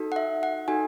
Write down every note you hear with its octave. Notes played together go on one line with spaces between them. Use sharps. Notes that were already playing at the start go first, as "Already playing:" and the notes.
Already playing: D#4 F#4 A4
F#5
E5
F#5
D#4 F#4 A4 G#5